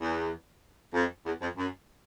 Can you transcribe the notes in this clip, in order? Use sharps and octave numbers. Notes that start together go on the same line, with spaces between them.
E2
F2
E2
F2
F#2